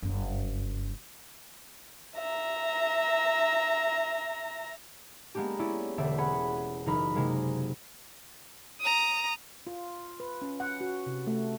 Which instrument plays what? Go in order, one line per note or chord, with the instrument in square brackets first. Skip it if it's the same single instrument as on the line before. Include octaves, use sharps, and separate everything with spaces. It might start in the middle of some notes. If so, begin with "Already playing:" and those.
[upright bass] F#1 G2
[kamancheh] E5 A#5
[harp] G#3 A#3 B3 D4 G4
C#4 E4 D5
E1 D3 C4 D5 E5
C#4 G#4 B4 F#5 B5
F#1 E3 D#4 A#4 B5 B6
C3 G#3 A#3
[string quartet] A#5 D#6
[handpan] F4
B4
C#4
F#5
F#4
C3
A3